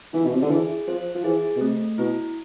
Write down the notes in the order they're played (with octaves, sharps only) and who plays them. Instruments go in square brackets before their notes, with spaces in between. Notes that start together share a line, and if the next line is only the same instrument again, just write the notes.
[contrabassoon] E3 [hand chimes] F4
[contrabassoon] B2
C3
D3
[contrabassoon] E3 [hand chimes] G#4
[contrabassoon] F3 [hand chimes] C5
[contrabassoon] F3
[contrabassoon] E3 [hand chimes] G#4
[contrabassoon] B2
[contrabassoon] C3 [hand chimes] A3
[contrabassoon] B2 [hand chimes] E4